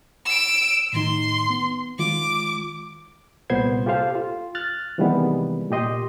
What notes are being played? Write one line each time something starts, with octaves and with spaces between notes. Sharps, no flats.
E6 D7
A2 D#3 D#4 C6
B3
D#3 G#3 F4 D6
C2 A#2 B3 C5 C6 G#6
F4 G4 A4 C5 F5
F4
F6 F#6 A6
C3 D#3 E3 G3 G#3 B3
A#2 G4 D#5 C6